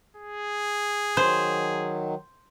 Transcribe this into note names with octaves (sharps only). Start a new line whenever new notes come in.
G#4
D#3 F#3 C5